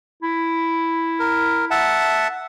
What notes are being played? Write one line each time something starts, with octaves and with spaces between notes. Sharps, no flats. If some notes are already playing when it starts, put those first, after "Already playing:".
E4
A#4
E5 F#5 A5